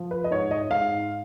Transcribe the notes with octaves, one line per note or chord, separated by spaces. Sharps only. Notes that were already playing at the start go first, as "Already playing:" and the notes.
Already playing: F3
B4
D#5
G#2 C#5
D#5
G#2 F5